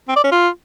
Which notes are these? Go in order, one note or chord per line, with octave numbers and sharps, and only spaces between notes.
C4
D5
C#4
F4